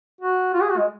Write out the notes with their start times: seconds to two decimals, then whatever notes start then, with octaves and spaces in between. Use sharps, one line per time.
0.21 F#4
0.54 F4
0.61 G#4
0.70 F#4
0.78 G#3